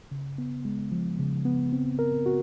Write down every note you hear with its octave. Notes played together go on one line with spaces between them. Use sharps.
C#3
B3
G#3
F3
C#3
B3
C4
A#4
F#4